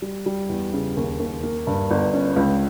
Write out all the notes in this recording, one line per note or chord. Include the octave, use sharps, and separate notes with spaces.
G3
G3
E2
C#3
D#2
D#2
A#3
G2
G1
C#4
C#2